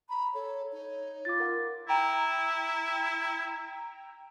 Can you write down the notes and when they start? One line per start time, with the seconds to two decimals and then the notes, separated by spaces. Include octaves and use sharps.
0.09 A#5 B5
0.34 A4 C#5
0.72 D#4 C#5
1.25 F4 D6 A6
1.40 A#4 F#5
1.89 E4 G5 A#5